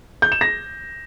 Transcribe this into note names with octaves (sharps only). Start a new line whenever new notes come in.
G6
E7
A#6